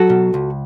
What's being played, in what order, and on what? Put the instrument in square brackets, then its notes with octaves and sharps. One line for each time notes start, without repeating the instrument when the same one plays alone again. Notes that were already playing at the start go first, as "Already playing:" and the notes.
Already playing: [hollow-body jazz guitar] F#3 F#4 A4
B2
C#2